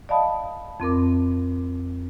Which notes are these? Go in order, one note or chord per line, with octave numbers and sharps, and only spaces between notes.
D5 D#5 F5 A5 B5 D#6
F2 C4 A#4 D6